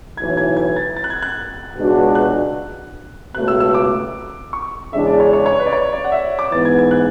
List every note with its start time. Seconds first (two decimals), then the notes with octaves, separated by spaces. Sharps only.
0.17 B1 A2 E3 G#6
0.37 G#6
0.57 G#6
0.76 A6
0.97 A6
1.04 F#6
1.10 G#6
1.22 F#6
1.76 C#2 B2 G#3 D4 F#4
2.15 F#6
3.35 C#2 B2 A3 F#6
3.48 E6
3.60 E6
3.74 D6
4.53 C#6
4.93 E2 C#3 G#3 D4 E5
5.07 D5
5.20 C#5
5.33 C#5
5.46 C#5
5.59 B4
5.66 D5
5.73 C#5
5.93 D5
6.04 F#5
6.12 E5
6.39 D6
6.52 G#2 E3 B3 A6
6.65 G#6
6.79 G#6
6.91 F#6